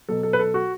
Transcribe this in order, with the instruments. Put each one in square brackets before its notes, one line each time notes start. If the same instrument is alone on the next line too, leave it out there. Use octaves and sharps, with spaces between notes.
[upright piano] B2 F#3 A4
A4
B4
A4
F#4